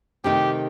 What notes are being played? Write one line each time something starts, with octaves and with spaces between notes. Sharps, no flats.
C3 D#3 A3 D#4 G4